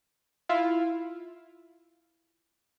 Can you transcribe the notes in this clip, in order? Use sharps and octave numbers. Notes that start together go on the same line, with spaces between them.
E4 F4 F5